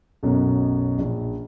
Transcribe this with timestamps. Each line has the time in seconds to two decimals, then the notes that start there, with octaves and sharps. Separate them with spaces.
0.23 B1 F#2 B2
0.99 A#1